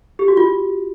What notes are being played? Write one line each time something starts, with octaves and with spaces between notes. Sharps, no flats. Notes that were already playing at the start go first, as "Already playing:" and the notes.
G4
F#4
F4